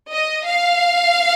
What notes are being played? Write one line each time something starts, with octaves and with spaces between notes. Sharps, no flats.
D#5
F5